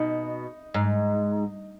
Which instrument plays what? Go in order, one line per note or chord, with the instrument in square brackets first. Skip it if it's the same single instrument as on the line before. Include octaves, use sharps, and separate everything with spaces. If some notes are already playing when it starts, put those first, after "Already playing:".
Already playing: [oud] B2 [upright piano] D#4
[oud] G#2